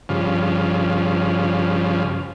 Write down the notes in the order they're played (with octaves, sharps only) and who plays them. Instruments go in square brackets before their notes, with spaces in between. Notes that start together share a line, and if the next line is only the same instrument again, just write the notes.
[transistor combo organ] G2 C#3 F3